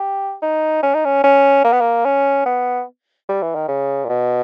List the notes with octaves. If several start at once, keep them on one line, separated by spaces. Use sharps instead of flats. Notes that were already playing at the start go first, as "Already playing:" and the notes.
Already playing: G4
D#4
C#4
D#4
C#4
C#4
A#3
B3
A#3
C#4
B3
G3
E3
D#3
C#3
A#2
B2